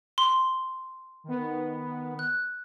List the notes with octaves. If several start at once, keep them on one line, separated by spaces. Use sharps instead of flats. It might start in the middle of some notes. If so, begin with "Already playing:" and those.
C6
D#3 B3
F#6